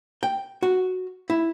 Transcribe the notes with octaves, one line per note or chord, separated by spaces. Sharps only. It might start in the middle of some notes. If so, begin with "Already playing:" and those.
G5
F#4
E4